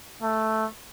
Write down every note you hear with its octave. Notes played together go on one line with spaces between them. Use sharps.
A3